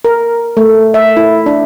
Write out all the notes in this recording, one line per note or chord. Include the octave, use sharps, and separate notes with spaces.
A#4
A3
E5
E4
D4